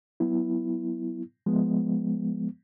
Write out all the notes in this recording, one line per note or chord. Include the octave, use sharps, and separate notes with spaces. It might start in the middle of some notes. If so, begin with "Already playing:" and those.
F#3 B3 E4
F3 G#3 B3